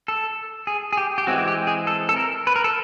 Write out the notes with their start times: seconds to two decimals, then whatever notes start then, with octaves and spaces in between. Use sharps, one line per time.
0.08 A4
0.67 G#4
0.93 G#4
0.97 G4
1.18 G4
1.27 E3 G#3 C4 F#4
1.48 G4
1.67 G#4
1.87 A4
2.09 A4
2.16 A#4
2.47 B4
2.56 A#4
2.64 A4